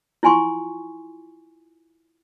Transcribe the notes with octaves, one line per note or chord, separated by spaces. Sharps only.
E4 F4 G#5 C6 C#6